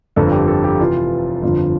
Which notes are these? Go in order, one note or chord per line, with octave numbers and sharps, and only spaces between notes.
G1 F2 D3 A4
G4
A4
G4
F1 F2 E3 F4
G1 F2 D3 F4